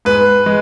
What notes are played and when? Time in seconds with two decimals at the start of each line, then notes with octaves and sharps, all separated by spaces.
0.05 G#2 B4
0.46 G#3